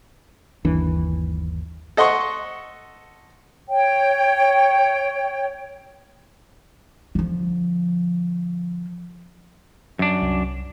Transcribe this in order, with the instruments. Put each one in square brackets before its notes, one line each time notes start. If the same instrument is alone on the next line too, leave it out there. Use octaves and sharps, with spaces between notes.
[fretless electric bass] G1 D#2 E3 D4
[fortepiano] A4 D#5 F#5 C6 C#6
[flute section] C#5 G5
[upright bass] D3 F3
[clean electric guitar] F#2 D4
[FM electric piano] C2